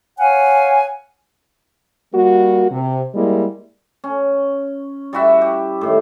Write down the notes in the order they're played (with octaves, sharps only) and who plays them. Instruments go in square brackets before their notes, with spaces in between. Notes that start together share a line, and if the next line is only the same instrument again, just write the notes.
[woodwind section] C#5 F5 F#5 G#5
[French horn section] G3 A#3 F#4
C3
G3 G#3 A#3 E4
[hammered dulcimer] C#4
G3 E4 F#4 E5
G4
A2 D#3